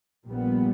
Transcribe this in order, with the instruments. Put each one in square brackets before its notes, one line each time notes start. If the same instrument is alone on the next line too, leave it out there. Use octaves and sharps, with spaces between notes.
[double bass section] A#1 A#2 G3 B3